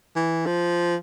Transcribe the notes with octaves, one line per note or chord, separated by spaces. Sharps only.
E3
F3